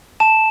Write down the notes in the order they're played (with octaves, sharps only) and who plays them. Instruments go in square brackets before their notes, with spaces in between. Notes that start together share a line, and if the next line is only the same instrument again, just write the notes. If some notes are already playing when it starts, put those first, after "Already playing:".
[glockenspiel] A5 E7